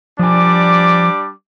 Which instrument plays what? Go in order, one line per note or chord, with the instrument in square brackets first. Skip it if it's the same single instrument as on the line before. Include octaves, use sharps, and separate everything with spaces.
[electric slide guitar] F3 G#5 [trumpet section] G3 D4 D6